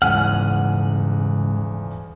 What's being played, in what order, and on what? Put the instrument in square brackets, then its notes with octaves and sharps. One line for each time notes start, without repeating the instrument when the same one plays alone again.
[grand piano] D#1 E2 [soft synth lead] G#2 [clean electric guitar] C#3 F#5 [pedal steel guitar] G#5 F6